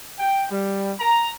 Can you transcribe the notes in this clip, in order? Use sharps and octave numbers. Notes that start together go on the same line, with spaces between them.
G5
G3
A#5